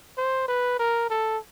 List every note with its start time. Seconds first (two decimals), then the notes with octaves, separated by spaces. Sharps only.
0.18 C5
0.48 B4
0.79 A#4
1.10 A4